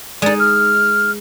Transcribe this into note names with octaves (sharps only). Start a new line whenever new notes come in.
G#3 D#4 D5
F6